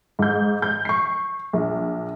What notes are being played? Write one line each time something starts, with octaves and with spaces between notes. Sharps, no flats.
G#2 G6
G6
C#6 C7
A#1